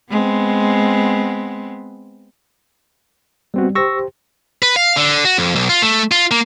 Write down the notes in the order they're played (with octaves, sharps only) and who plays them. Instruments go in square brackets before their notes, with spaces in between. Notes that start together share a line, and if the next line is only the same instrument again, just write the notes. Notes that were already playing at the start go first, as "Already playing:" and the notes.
[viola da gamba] G#3 B3 C4
[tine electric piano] G3 [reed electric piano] B3 C4 F#4
[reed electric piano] G4 C5 [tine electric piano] C#6 E6 A#6
[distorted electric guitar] B4
F5
D3
F#4
F2
B1
F4
A3
F4
A#3